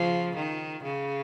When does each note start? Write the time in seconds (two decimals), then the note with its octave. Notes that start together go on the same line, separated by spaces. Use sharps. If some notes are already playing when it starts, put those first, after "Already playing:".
Already playing: C#3 F3
0.36 D#3
0.84 C#3